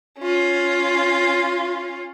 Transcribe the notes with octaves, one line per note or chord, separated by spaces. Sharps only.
C#4 F4